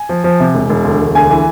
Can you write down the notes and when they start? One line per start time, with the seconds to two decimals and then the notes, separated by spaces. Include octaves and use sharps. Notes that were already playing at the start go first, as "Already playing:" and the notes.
Already playing: G#5
0.09 F3
0.24 F3
0.40 C3
0.54 E1
0.69 E1
0.85 D2
1.00 E1
1.15 D2 G#5
1.30 E3